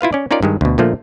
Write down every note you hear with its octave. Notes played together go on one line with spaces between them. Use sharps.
E4 F4 B4 F5
C#4 D5
C#4 D#4 F4 A#4 D5
G2 D#3 G#3
D2 B2
A#2 D3 F3 A3 A#3